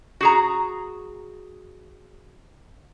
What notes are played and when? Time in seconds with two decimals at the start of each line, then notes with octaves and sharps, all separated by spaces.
0.21 F#4 G#4 A#5